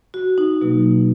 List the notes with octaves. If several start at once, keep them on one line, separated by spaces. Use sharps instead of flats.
F#4
D#4
B2 F#3 A#3